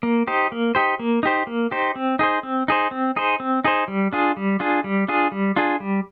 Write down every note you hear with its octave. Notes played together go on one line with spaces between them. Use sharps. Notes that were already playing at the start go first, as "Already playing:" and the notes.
A#3
D#4 G4 C5
A#3
D#4 G4 C5
A#3
D#4 G4 C5
A#3
D#4 G4 C5
C4
D#4 G#4 C5
C4
D#4 G#4 C5
C4
D#4 G#4 C5
C4
D#4 G#4 C5
G3
D4 F4 G#4
G3
D4 F4 G#4
G3
D4 F4 G#4
G3
D4 F4 G#4
G3